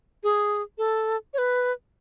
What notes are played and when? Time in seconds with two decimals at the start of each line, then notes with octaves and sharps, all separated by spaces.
0.23 G#4
0.78 A4
1.34 C#5
1.38 B4